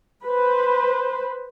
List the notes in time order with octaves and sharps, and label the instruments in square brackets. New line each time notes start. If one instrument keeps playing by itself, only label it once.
[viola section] B4 C5